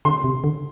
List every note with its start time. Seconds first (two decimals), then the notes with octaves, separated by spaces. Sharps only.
0.05 D3 C6
0.24 C3
0.44 D3